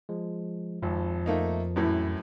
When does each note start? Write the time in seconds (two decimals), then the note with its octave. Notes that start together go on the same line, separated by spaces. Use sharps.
0.09 F3 G#3
0.83 G#1 F2 F3
1.26 A3 A#3 D#4
1.76 F#2 A2 E3